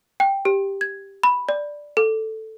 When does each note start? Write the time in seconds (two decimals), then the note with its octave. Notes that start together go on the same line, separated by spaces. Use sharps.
0.20 G5
0.45 G4
0.81 G#6
1.23 B5
1.49 D5
1.97 A4